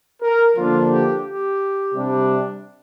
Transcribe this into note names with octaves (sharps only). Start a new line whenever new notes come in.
A#4
D3 F3 A#3 D4 F4
G4
G4
C3 G3 D4